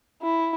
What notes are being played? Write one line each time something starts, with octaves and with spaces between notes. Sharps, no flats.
E4